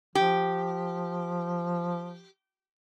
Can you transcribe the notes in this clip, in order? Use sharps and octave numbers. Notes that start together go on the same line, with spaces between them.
F3 G4